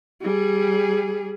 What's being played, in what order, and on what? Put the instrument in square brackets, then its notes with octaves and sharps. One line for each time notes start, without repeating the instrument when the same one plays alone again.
[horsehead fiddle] G3 G#4